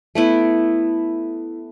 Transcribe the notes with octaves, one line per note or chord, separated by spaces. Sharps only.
A3 B3 E4